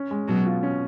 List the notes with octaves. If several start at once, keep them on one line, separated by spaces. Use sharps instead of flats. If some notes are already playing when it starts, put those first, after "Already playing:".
Already playing: C#4
G#3
B2 F#3
F4
C#4